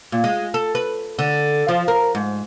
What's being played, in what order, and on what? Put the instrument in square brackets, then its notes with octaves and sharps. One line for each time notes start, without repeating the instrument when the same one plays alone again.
[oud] A#2
G#3
A4
B4
D3
F3
A#4
G#2